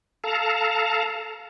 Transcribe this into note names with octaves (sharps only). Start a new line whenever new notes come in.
A4 F5 A5 A#5